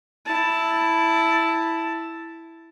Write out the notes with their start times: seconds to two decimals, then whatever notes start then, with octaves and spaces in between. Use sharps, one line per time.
0.26 E4 A5